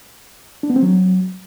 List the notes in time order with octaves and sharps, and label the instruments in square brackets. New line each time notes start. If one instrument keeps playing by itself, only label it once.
[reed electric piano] D4
B3
C4
F#3